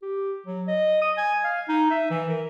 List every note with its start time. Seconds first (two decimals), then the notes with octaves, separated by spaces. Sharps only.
0.02 G4
0.46 F#3
0.68 D#5
1.02 D#6
1.17 G#5
1.44 F5
1.68 D#4
1.91 E5
2.10 E3
2.29 A#4